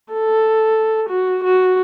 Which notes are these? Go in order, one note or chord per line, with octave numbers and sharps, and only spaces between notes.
A4
F#4
F#4